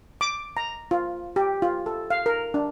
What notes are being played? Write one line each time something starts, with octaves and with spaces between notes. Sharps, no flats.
D6
A#5
F4
G4
F4
A4
F5
A#4
D4